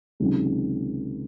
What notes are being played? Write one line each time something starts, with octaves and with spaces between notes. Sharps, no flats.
C#2 C3 D#3 F#3